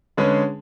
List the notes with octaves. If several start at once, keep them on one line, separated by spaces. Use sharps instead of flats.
D3 G#3 C#4 G#4 B4